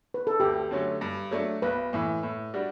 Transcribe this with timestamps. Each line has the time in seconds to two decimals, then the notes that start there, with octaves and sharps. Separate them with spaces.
0.14 B4
0.27 A4
0.40 D2 G4
0.71 D3 F#3 A3 C#4
1.01 G2
1.31 F#3 A3 D4
1.62 B1 B4
1.93 A2 E3
2.23 A2
2.54 G3 D4 F#4